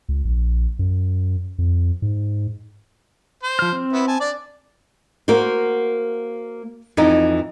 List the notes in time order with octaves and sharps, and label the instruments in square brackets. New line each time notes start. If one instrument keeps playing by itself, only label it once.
[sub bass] C#2
A#1
F#2
F2
G#2
[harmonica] C5
[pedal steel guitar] F3 F6
C4
[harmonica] B3 E4
G#5 A5
D4 D5
[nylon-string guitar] A#3 F#4 A#4 C5
F2 E3 D#4